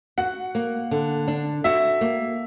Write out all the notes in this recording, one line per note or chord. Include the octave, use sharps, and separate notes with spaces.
F#4 F#5
A#3
D3
D4
F#4 E5
A#3